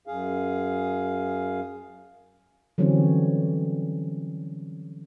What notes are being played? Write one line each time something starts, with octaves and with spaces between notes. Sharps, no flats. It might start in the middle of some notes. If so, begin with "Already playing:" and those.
F#2 G#4 F5
D3 E3 F#3 G3 C4 C#4